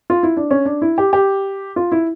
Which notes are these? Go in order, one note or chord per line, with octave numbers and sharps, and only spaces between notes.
F4
E4
D4
C#4
D4
E4
G4
G4
F4
E4